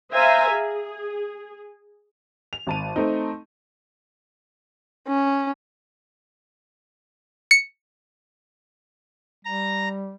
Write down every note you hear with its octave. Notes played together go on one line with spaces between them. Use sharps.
C5 E5 F5 G#5 A#5
G#4
F7
G#1 A5 D#7
A3 C4 D#4
C#4
C#7
G3 A#5